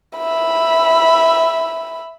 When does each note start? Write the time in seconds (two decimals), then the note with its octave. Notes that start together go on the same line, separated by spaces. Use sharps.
0.18 E5 B5